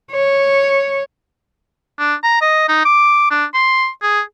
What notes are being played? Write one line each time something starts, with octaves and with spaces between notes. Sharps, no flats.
C#5
D4
A#5
D#5
D#4
D6
D4
C6
G#4